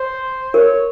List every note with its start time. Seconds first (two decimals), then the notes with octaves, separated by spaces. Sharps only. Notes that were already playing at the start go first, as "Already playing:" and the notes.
Already playing: C5
0.54 A#4 C#5